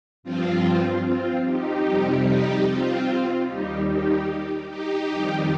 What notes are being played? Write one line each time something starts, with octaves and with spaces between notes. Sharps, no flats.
G2 F3 C4 F4
C4 F4
D#4 G4
F2 C3 G3
D#4 G4
C4 F4
D#2 D#3 G3 D#4 G4
D#4 G4
D#4 G4
F2 D#3 G3